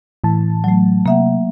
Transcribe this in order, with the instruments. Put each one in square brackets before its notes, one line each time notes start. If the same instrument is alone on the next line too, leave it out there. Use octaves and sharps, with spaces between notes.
[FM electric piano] A2 E3 A5
[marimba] F#3 A3
[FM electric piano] C3 [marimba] A#3 E5 F#5